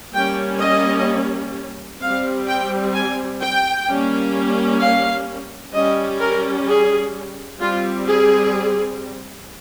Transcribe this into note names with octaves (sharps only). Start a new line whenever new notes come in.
G3 A#3 C#4 G5
D#5
G3 C4 F5
G5
G#5
G5
G3 A#3 C#4
F5
G3 C#4 D#5
A#4
G#4
G3 C4 F4
G#4